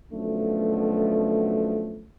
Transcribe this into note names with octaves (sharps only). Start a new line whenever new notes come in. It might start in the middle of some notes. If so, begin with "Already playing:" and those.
F#2 B2 D3 F3 A3